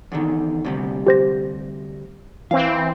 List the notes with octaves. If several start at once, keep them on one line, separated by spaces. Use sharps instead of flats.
E2 D3 D#3
D2 C3 G3
G4 C5 A#6
E3 C4 F5